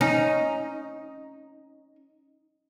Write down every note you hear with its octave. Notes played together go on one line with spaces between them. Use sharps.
C#4 D#4